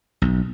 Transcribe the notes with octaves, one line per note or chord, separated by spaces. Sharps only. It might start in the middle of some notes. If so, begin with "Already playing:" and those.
B1